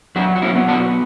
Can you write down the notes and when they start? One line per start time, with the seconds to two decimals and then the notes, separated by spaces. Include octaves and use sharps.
0.16 F#3 D4 F#4
0.35 F#4
0.42 C#4 E4
0.56 B3
0.68 D4 F#4